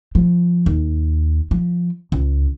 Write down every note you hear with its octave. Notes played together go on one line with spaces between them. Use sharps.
F3
D#2
F3
C#2